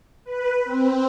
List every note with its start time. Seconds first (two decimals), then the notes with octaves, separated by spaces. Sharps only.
0.24 B4
0.64 C4